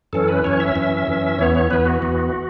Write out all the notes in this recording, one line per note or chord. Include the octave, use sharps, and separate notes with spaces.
F#2 E3 C#4 A4
B4
F#2 E3 C#4 C#5
E5
F#2 E3 C#4
F#2 E3 C#4
E2 E3 B3 C#5
C#5
E2 E3 B3 B4
F#4
E2 E3 B3